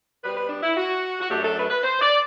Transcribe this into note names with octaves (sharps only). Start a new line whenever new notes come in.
B2 G3 C4 B4
B4
D4
E4
F#4
F#4
F#2 F#3 A3 D4 G4
A4
B4
B4
C5
D5